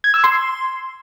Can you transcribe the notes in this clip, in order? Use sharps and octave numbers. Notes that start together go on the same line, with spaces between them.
G#6
E6
C6